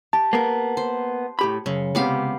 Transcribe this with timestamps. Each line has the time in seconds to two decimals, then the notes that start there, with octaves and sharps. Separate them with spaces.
0.13 G4 A5
0.33 A#3 B3 A#4
0.77 C5
1.39 A2 G4 B5
1.66 F#2 C#3
1.95 C#2 C3 B3 G4 F5